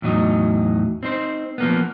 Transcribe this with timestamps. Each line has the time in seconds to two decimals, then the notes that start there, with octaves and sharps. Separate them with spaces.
0.02 E2 A2 F#3 D#4
1.03 C4 D#4 C5
1.58 F3 A#3 B3